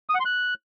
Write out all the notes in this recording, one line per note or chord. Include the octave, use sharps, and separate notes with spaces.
D#6
F#5
C6
F#6